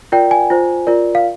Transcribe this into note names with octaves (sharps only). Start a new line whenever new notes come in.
F4 A#4 D5 G5
G#5
F4 C5
F4 A#4 D5
F5